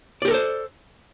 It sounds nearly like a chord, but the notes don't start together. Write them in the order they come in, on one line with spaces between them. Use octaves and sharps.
D5 G4 A#4 A4 C5